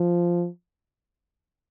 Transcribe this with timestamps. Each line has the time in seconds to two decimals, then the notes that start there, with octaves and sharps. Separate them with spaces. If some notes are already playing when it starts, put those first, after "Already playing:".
Already playing: F3